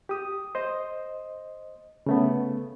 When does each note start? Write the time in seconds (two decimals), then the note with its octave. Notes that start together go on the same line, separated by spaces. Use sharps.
0.09 G4 D#6
0.55 C5 D#5
2.06 C#3 A3 B3